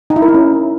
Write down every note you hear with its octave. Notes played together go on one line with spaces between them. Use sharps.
D#4
E4
A#4
E4
C#4